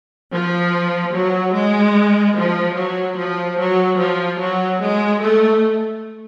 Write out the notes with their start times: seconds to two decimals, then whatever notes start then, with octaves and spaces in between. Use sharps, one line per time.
0.32 F3
1.13 F#3
1.55 G#3
2.36 F3
2.76 F#3
3.18 F3
3.59 F#3
4.00 F3
4.40 F#3
4.80 G#3
5.22 A3